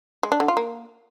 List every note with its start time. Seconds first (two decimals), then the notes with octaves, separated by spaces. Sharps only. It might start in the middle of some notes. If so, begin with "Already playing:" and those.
0.23 G#3
0.32 D4
0.40 D3
0.48 F4
0.57 A#3